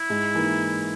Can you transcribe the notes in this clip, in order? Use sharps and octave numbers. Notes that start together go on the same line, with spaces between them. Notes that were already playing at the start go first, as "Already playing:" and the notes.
Already playing: E4
G#2
E3 A#3 D#4